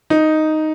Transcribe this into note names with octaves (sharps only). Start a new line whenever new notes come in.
D#4